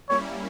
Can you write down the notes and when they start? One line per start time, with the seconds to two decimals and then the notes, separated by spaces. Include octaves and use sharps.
0.09 G3 A#3 C#4 E4 C#5